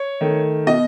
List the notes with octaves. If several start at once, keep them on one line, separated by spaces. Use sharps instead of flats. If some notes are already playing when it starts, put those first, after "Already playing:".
Already playing: C#5
D#3 A3
B2 D#5